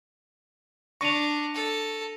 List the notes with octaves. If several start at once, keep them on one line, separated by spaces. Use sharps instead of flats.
D4 C#6 A#6 D#7 F7
A4